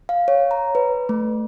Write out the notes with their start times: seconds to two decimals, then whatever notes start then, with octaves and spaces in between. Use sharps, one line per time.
0.09 F5
0.28 C#5
0.51 A#5
0.75 B4
1.09 A3